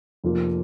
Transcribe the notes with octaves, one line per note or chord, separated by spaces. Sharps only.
F1 F2 F3 A#3 F4